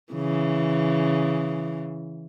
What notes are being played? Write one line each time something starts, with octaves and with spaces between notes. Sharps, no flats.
C#3 E3